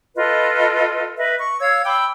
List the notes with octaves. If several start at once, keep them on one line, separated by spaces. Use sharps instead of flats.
F4 A4 B4 D#5
B4 D#5 E5
C#6
C#5 F5 E6 G#6
G5 B5 D6 E6